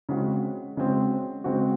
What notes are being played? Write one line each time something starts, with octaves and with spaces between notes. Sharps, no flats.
C#3 G#3 C4 F#4
C#3 G#3 C4 F#4
C#3 G#3 C4 F#4